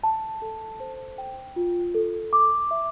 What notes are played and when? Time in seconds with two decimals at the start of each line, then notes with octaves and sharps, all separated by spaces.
0.03 A5
0.42 A4
0.80 C5
1.18 G5
1.56 F4
1.94 A4
2.33 D6
2.71 E5